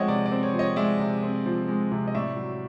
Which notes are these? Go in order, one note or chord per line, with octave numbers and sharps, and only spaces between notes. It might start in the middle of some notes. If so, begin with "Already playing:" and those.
Already playing: F3 G#3 C4 C#5 D#5 E5 F#5 G5
C3 D5
D5
C4
C#5
F3
C#5 D#5
G#3 D5 E5
C3
C4
F3
G#3
C3
D#5
A2 D5 E5
F#3